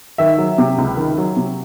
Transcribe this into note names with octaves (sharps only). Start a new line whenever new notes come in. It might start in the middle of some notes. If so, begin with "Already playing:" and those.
D#3 E5
F#3
C3
C#2
D#3
F#3
C3